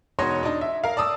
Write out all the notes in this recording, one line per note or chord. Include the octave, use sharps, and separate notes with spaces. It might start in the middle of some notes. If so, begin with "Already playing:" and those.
E1 D#4 F#4 C#5 D#5 C6
D4 D#4
E5
A#4 F5
D5 A5 D#6 E6